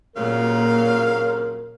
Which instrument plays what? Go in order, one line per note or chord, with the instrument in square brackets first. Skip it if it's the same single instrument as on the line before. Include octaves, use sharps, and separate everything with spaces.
[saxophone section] F2 C#3 F#3 [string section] A#2 [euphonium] A#4 [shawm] F5